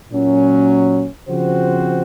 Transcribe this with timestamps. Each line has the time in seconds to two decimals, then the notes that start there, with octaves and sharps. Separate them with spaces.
0.11 A#2 F#3 C#4
1.28 C#3 F3 C4 F#4 C5